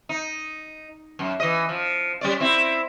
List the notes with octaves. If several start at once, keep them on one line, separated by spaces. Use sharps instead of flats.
D#4
F#2
E3 D#5
F3
G3 C#4 D5
C4 E4